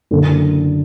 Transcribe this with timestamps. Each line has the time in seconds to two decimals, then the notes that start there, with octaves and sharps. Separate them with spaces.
0.11 F#1 F#2 D3